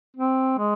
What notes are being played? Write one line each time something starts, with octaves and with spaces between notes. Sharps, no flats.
C4
G#3